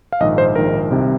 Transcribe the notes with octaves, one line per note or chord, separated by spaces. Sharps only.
F5
A#1 G#2 D#3 D#5
C5
A#1 G#2 D#3 A#4
C2 C3 D#3